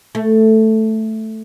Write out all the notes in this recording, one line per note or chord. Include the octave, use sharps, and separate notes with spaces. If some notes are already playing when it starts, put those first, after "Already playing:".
A3